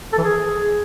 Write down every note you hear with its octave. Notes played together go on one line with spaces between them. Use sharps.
A4
E3
G#4